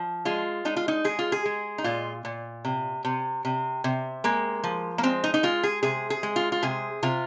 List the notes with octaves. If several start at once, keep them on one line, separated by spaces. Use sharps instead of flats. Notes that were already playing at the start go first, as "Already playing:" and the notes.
Already playing: F3
G#3 F4
G#3 D#4
F4
D#4
G#3 G#4
F4
G#4
G#3
D#4
A#2 F4
A#2
C3
C3
C3
C3
G#3 A#3
F3
A#3
G#3 C4
D#4
D#4
G#3 F4
G#4
C3 G#4
G#4
G#3
F4
F4
C3 G#4
C3 F4